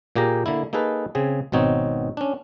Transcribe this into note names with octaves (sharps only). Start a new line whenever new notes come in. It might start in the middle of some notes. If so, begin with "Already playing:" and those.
A#2 A#3 G4 G#4 A#5
D3 A#3 E4
A#3 D#4 G#4 A4 B4
C#3 C4 G#4
G#1 B2 C4 D#4 C#5
C#4 D4